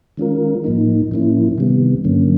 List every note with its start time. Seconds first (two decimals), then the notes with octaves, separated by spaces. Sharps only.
0.17 D#3 G#3 C#4 F4 A#4
0.64 A2 F3 A#3 D#4
1.11 A2 F3 A#3 C#4 E4
1.58 C3 D#3 G3 B3
2.04 G2 D3 F#3 A#3 C#4